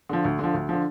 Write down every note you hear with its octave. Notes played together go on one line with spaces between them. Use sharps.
D3 F3
D2
D3 F3
D2
D3 F3